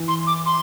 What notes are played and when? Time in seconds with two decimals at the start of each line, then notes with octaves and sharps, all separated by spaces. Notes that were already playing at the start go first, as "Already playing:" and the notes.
Already playing: E3
0.08 C6
0.27 D6
0.46 C6